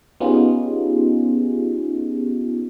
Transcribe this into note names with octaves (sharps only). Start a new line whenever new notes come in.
B3 C#4 D#4 F4 G4 G#4